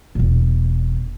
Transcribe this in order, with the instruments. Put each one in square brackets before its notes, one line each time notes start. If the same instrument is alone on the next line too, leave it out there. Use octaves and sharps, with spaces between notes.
[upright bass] E1 A#2